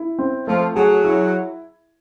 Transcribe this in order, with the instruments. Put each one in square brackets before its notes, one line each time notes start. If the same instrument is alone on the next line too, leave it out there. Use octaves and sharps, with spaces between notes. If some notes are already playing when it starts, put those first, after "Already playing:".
Already playing: [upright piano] E4
C4
[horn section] F3 F4 [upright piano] A3
[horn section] F#3 F#4 [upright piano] G#4
[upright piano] E4